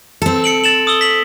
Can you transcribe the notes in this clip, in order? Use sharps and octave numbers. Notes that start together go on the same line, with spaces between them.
C4 A4
C#7 D7 F#7
A6 E7 F#7
D#6 E6 G7
B6 F#7